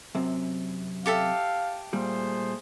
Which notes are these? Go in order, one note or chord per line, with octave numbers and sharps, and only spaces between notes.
F#2 C3
G4 A4 E5 F5
A#2 G3 A3 G#4 C5